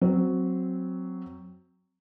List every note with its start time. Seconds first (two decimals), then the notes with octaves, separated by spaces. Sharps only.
0.01 F#3 C4